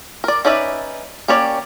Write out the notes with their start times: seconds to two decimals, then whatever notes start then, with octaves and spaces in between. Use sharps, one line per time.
0.24 A#4 D5
0.45 C#4 D#4 B4 D5 E5
1.28 A#3 C#4 G4 C#5 D5